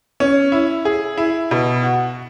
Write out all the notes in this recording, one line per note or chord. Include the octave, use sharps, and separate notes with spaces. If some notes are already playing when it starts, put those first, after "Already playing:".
C#4
E4
G#4
E4
B2
F#4